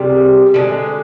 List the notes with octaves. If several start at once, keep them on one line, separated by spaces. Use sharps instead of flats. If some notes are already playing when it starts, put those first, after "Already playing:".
Already playing: C3 G3 G#4 A#4
D3 F3 G#3